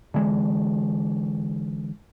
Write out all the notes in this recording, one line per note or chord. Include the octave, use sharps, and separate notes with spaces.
D3 E3 G#3